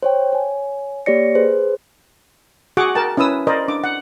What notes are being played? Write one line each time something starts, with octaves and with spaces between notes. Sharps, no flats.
C5 C#5 G5
C#5 G#5
A#3 G4 C#5 D5 A#6 C#7
G#4 B4 C5
F#4 G#4 F#5 C#6 D6
A#4 G5 A5
C#4 E4 B4 D#6 E6
A#4 C5 D5 D#5
D4 D6
F#5